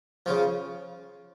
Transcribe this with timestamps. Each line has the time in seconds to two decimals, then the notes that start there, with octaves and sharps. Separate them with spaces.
0.26 C#3 F3